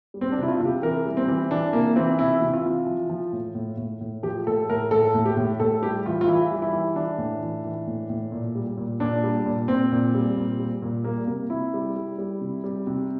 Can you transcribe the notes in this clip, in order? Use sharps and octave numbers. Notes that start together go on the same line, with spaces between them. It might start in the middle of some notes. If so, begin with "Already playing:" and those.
G3
C4
D4
C3 E4
F4
C3
G4
E3 A#4
G3
C4
E3
E3 D4
C3 A#3
E3 C4
C3 E4
C3
F4
E3
F3
F3
A2
A2
A2
A2
F3 G4
A2 A4
A2 A#4
A2 A4
A2
G4
A2
A2 A4
G3 G4
E3 F4
F4
E3 E4
G3
E4
E3
E3 D4
A2
E3
E3
A2
A2
A#2
G3
A#2
A#2 D4
G3
A#2
A#2 C4
A#2
G3
A#2
G3
A#2
G3 A#3
C3 A#3
C3 E4
G3
G3
G3
C3
G3
C3